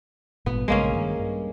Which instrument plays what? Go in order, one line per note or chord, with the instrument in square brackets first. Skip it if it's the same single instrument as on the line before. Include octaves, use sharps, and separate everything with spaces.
[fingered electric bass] G#1 G2 A#2 [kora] B3
[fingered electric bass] A#1 G2 C#3 [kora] G#3 A#3 C#4
[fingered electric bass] G2 D3 D#3
G2